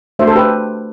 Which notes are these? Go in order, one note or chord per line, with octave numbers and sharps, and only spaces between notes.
A3 D4 F#4 C5 E5
A4
G4 B4